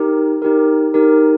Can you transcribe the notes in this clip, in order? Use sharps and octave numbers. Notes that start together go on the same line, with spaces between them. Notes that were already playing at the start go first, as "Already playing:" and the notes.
Already playing: D#4 G4 A#4
D#4 G4 A#4
D#4 G4 A#4